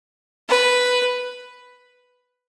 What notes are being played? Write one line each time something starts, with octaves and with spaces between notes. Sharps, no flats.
B4